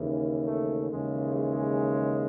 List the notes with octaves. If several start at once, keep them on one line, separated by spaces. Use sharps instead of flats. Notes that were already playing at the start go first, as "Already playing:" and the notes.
Already playing: D#2 C#3 E3
A3
D#2 C#3 E3 G#3
G#3